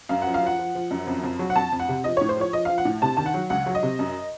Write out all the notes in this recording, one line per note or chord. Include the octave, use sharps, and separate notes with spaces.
F#2 F5
F#5
F3
F5
F3 F#5
F3
F3
F#2
F2
F2
F#3
F#5
F2 A5
F2
F#5
C3
F3 D#5
C#5
A2
C5
F3 C#5
F3 D#5
F5
F3
F#5
A2
C3 A5
D#3 A5
F#5
F#3
C#2 F#5
F#3
D#5
C3
F#2